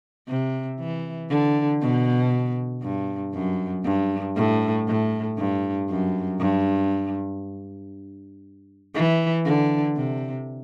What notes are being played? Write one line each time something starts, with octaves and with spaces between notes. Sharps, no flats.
C3
E3
D3
B2
G2
F#2
G2
A2
A2
G2
F#2
G2
E3
D3
C3